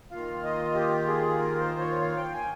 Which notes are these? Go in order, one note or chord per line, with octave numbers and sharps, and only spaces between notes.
D#3 A#3 F4 F5
D#5
G4
G#4
A#4
C5
C#5
F5
G5
G#5